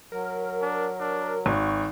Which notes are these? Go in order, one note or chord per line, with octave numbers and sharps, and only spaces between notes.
F#3 A#4
D4
D4
G#1 F#4 C#6